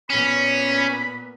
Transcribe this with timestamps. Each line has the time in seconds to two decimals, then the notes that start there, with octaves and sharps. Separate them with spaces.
0.10 A#2 B3 C#4 B5